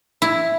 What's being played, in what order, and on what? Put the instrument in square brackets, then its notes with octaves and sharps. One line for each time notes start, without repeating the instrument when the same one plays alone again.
[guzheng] E4